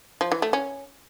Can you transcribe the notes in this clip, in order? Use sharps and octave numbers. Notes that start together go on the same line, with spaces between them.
F3
E3
A3
C#4